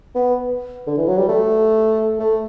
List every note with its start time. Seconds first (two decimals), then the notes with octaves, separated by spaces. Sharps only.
0.15 B3
0.87 D3
0.97 E3
1.07 F#3
1.18 G3
1.28 A3
2.19 A3